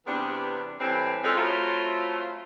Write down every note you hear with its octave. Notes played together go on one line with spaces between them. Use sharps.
E2 C3 E3 G3 B3 D4
A2 E3 G3 C4
G#3 C4 C#4 D#4 F4 A4
F#3 A3 C4 E4 F4